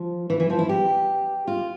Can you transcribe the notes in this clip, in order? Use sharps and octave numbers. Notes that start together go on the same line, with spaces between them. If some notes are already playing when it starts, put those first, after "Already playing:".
Already playing: F3
E3
E3
F3
E4
G4
F4